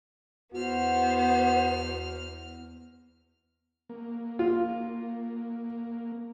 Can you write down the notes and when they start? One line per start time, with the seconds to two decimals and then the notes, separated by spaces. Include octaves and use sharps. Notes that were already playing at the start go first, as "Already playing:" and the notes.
0.54 E2 B3 F#4 C5 F6
3.89 A#3
4.39 F4